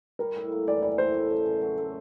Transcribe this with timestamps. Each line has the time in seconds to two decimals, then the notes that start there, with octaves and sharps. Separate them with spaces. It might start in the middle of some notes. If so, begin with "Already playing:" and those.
0.19 G3 A#4
0.36 A2
0.52 A#3
0.67 E3 D5
0.82 G3 D5
0.98 A2 C5
1.14 A3
1.31 C#3
1.46 C#3
1.62 F#3
1.77 A3